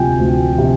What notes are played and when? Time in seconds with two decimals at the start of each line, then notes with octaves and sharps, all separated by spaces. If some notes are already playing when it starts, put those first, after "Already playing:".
Already playing: D2 C3 F3 G5 G#5
0.19 D2
0.58 C3